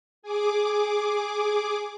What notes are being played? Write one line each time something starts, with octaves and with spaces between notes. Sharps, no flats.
G#4 D6